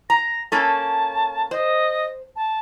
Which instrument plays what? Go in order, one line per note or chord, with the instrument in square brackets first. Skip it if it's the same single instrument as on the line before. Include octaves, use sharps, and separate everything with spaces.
[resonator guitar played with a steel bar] A#5 [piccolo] A#6
[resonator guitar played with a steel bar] A#3 C#4 A4 [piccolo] A5
[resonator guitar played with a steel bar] C5 [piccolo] D#5
[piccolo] A5